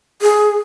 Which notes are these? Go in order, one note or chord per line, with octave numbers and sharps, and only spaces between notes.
G#4